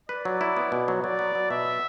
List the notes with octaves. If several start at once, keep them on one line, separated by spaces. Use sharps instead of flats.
B4 D5
F#3
E4
B3
B2
F#3
F#3 D5
B3
F#3
B2 E5